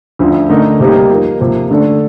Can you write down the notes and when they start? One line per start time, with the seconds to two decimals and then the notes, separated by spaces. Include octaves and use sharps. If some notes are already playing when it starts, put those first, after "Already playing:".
0.19 D2 D3 F3
0.50 D3 A3 D#4 A#4
0.80 C3 G3 A#3 D#4 G4
1.10 F3 A#3 D#4 A#4
1.40 C3 F3 A#3
1.71 D3 A3 D4 A4